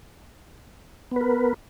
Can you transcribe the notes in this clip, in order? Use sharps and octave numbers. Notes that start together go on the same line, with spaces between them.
B3 A#4 B4